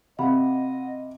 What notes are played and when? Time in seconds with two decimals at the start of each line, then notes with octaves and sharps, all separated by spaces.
0.19 C3 D#5 F5 F#5 B5